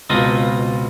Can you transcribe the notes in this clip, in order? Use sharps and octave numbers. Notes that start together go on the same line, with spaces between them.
C#2 B2 C4 F4 D#5